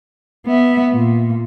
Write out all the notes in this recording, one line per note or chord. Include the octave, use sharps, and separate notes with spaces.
B3 E5
A#2